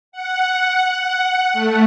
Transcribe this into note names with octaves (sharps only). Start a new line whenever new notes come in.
F#5
F#5
F#5
A3